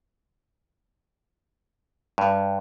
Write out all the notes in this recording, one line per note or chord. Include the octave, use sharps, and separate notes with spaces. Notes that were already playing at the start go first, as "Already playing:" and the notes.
G2